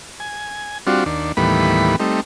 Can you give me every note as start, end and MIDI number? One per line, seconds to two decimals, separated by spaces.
0.20 0.78 80
0.87 1.04 55
0.87 1.04 60
0.87 1.04 62
0.87 1.04 65
0.87 1.04 66
1.06 1.32 39
1.06 1.32 62
1.37 1.96 39
1.37 1.96 45
1.37 1.96 52
1.37 1.96 55
1.37 1.96 59
1.37 1.96 83
2.00 2.21 55
2.00 2.21 57
2.00 2.21 60
2.00 2.21 63